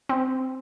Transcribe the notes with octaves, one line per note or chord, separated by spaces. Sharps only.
C4